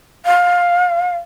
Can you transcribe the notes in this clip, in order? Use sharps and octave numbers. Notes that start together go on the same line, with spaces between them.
F5